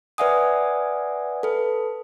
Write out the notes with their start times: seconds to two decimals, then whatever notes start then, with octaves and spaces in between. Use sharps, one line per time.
0.18 B4 D5 E5 F#5 G#5 D#6
1.43 A4 B4